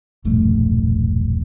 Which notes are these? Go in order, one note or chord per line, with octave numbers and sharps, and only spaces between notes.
E1 A#1 G2 A3